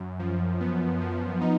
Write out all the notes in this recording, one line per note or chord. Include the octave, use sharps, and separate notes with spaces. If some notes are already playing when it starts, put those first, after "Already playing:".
Already playing: F#2
F3
B3
F3
D#4